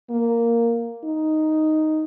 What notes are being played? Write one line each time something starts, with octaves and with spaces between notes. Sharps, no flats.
A#3
D#4